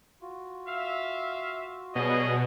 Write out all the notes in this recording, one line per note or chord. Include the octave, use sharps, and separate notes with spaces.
F4 F#4
E5 F5
B2 F#3 G3 G#4 D#5 C#6